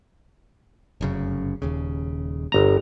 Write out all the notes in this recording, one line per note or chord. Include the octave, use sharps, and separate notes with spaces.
F1 F#2 C#3
D#1 D#2 C#3
G1 A#5